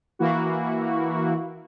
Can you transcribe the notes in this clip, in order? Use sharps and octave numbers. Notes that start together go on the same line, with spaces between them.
E3 A#3 E4 F#4